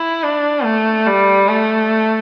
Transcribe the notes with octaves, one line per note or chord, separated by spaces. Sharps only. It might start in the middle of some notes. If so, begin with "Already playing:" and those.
Already playing: E4
D4
A3
G3
A3